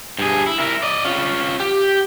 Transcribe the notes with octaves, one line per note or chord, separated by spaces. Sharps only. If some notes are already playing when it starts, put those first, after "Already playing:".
G2 G#4
E4
E4 A#4
D5 D#5
C#4 F4
G4